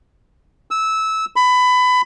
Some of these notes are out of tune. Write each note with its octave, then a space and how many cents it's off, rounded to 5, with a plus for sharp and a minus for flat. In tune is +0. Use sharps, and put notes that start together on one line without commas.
E6 -15
B5 +20